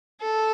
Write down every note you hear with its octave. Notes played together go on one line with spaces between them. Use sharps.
A4